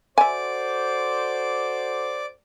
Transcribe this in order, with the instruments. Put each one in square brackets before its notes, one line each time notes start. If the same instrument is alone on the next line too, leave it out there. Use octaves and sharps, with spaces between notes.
[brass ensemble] F#4 A4 C5 [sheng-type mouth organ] D5 D6 [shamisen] E5 G#5